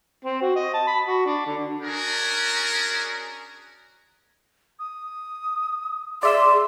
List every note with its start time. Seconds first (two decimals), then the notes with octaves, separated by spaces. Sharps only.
0.25 C4
0.41 F#4
0.56 D#5
0.74 A5
0.88 B5
1.06 F#4
1.26 D4
1.46 D3
1.82 C#4 D4 F#4 G#4 A#4
4.79 D#6
6.23 G#4 D5 E5 C6 E6